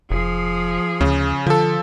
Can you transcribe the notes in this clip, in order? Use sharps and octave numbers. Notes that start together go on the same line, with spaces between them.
F1 F3 G#4
D2 C#3
D3 F3 A4